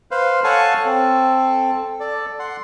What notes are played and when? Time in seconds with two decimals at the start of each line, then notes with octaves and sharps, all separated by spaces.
0.11 B4 C5 F5
0.44 A4 C#5 F5 F#5 G#5 A5
0.85 C4 A4
2.00 A4 D5
2.39 F#5 C6